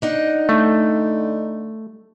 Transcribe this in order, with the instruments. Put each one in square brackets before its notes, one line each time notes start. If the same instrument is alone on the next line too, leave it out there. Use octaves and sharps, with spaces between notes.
[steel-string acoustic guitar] D4 D#4 F#5
[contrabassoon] D3 [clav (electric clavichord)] A3